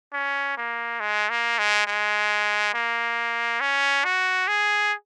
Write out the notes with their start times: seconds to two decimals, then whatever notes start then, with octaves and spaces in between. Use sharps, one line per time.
0.13 C#4
0.58 A#3
1.00 G#3
1.30 A#3
1.59 G#3
1.87 G#3
2.74 A#3
3.61 C#4
4.05 F#4
4.48 G#4